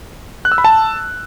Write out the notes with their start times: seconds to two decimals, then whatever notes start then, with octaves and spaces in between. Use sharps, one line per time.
0.45 F#6
0.52 E6
0.58 B5
0.64 A5